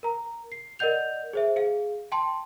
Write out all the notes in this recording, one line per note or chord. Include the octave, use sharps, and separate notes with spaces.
A#4 A#5
C7
A#4 D5 D#5 F#5 G6 F7
G#4 C5 E5
G#4 F5
G5 A5 C6